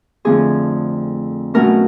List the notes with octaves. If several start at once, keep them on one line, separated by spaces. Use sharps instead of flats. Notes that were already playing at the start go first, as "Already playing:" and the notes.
F2 D3 F3 A3 C4 G#4
B2 F#3 A3 C#4 A#4